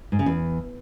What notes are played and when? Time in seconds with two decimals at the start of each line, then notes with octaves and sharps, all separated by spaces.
0.12 G#2
0.19 C#3
0.26 E2